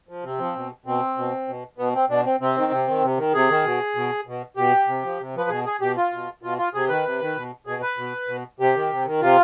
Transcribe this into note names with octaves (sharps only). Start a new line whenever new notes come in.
F3
C3 C4
F3
B2
B2 C4
B2
B2
B2 B3
C4
B2 D4
C4
C3 C4
D#3
C3
D#3
C3
D#3
C3 G#4
D#3
B2
B2
B2
B2 G4
C3
F3
C3
F3 B4
B2 G#4
G#4
B2 G4
F4
B2
B2 F4
F4
C3 G#4
D#3 B4
C3
D#3
B2
B2 G#4
B4
B2
B2
C3 G4
D#3
C3
D#3
C3 F4